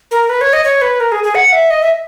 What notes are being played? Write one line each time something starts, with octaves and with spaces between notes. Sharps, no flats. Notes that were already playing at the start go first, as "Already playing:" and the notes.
A#4
B4
C#5
D#5
C#5
B4
A#4
G#4
G#4
F#5
E5
D#5
E5